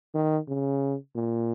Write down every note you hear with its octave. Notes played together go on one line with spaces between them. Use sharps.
D#3
C#3
A#2